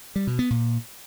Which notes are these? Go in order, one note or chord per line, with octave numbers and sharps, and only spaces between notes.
G3
B2
B3
A#2